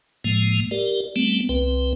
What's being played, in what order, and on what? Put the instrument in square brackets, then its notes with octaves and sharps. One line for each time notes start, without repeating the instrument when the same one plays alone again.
[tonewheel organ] A2 F3 G#3 A#3
G4 A#4 D5
G3 A3 B3 C4
C2 C4 B4